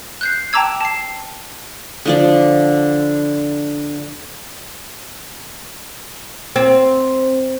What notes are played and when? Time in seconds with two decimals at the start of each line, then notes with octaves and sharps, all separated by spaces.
0.21 F#6 G6 C7
0.53 G5 A5 A#5 D6 E6 G#6
0.81 A5 C7
2.06 D3 F3 D5
6.56 C4